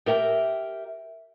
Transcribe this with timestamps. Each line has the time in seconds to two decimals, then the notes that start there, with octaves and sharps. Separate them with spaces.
0.06 G4 A#4 E5 G5